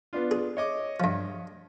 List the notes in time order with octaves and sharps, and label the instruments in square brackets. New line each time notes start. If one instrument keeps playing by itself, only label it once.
[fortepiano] B3 D4 F4
[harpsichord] G#4
[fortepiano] C#5 D#5 D6
[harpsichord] G2 F3